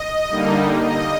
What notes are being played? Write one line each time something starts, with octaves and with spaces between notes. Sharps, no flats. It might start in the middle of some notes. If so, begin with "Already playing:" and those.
Already playing: D#5
D3 G3 A#3 D#4
D#5